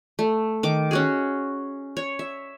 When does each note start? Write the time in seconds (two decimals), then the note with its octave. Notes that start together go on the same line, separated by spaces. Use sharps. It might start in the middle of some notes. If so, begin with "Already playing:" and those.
0.19 A3
0.63 D#3 D6
0.91 C#4 F#4 G#4
1.97 C#5
2.19 E5